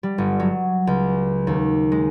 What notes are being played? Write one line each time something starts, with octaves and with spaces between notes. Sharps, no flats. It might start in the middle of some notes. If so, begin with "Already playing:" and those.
G3
G1
F#3
C#2
D#2
G#3